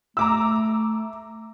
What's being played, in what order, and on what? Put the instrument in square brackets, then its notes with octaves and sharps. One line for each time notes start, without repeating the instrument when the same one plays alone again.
[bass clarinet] A3 [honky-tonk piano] A#5 D6 E6